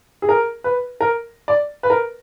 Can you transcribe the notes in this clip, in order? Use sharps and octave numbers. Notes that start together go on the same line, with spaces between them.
G#4
A#4
B4
A#4
D5
B4
A#4